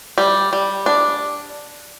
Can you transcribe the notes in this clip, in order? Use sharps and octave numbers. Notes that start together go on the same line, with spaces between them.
G3
G3
D4